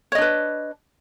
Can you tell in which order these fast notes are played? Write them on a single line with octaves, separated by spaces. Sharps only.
C#5 D#5 D4 B4